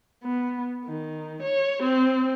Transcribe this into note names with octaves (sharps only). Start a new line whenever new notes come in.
B3
D#3
C#5
C4